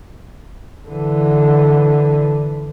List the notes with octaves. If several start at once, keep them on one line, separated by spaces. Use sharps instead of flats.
D3 E3